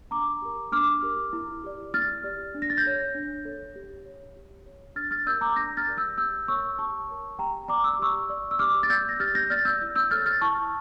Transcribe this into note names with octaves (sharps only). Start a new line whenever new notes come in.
D4 A#5 D6
G4 A#4
D4 D6 F6
G4 A#4
E4
G4 D5
E4 F6 A6
G4 D5
D4
A#6
A6
G6 A#6
A4 C#5
D4
A4 C#5
G4
C#5
G4
C#5
D4 F6 A6
F6 A6
G4 A#4 D5 E6 G6
A#5 D6
D4 G6 A#6
F6 A6
G4 A#4 D5
E6 G6
G4 E6 G6
A#4 C#5 C#6 E6
G4 A5 C#6
A#4 C#5
G4 G5 A#5
D5 A#5 D6
E6
D6
G4 C#6 E6
D5
E6
G4 D6 F6
A6
D5 E6 G6
A#6
G4 F6 A6
G6 A#6
D5 F6 A6
E6 G6
E4
E6 G6
A4 C#5 F6 A6
F6 A6
E4 A5 C#6